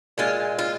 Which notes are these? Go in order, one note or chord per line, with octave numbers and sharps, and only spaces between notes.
A#2 G#3 F4
F4